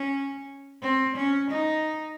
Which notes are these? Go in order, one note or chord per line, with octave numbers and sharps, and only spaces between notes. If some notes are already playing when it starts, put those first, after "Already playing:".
Already playing: C#4
C4
C#4
D#4